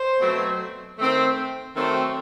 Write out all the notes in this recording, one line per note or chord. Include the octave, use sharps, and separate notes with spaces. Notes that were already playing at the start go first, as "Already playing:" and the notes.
Already playing: C5
B2 F#3 A3 C4
D#3 A3 C4
D#3 F#3 A3 C4